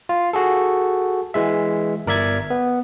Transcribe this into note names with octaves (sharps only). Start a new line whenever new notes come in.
F4
F#4 G#4 A4
E3 G#3 E5
G1 A#4 D5 E5 G#6
B3